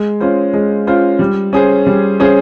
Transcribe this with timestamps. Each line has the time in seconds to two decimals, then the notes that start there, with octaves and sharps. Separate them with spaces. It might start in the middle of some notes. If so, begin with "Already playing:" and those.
Already playing: G#3
0.21 C#4 F4 C5
0.54 G#3
0.87 C#4 F4 C5
1.19 G3
1.53 C#4 G#4 C5
1.87 G3
2.20 C#4 G#4 C5